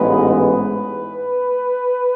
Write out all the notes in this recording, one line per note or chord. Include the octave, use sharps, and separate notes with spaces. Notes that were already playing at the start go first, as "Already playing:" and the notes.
Already playing: A1 G#2 G#3 B3 B4
B4